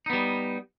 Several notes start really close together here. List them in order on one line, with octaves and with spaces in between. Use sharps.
D#4 B3 G3